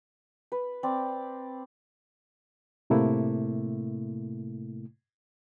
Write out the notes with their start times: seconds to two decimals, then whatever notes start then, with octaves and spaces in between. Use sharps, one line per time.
0.52 B4
0.83 C4 B4 D5
2.90 A2 C3 A3 A#3 E4